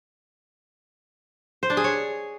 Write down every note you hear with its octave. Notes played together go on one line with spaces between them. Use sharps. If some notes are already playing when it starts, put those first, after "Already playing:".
C5
D4
G#4
C#5